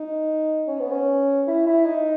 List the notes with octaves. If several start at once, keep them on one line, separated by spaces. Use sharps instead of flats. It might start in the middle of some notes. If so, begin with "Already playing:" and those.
Already playing: D#4
C#4
B3
C#4
E4
E4
D#4